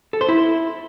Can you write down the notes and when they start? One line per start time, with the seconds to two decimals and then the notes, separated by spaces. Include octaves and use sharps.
0.13 A4
0.21 C5
0.29 E4